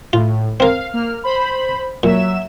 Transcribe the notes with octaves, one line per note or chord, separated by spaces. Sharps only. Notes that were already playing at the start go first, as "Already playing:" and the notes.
A2 F4
C4 A#4 F5
A#3 F6
C5 B5
A#2 F#3 E5 E7